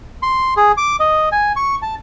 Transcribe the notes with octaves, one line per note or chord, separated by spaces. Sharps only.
C6
G#4
D6
D#5
G#5
C#6
A5